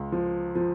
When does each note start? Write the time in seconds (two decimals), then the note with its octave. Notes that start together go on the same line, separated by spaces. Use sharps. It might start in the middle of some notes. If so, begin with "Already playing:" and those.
Already playing: C#2
0.12 F3
0.55 F3